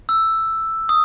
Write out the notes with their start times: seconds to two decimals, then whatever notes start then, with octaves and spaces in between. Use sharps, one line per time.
0.09 E6
0.89 D#6